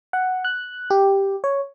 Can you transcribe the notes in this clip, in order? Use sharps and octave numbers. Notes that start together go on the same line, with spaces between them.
F#5
F#6
G4
C#5